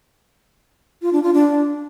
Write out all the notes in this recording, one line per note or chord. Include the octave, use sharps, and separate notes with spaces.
F4
D4
F4
D4